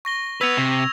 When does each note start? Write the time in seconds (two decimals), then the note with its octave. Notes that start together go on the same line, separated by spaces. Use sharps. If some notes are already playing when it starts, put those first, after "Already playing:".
0.05 C#6 A#6 G7
0.41 B3 B4 E6 G#6 F7
0.57 C3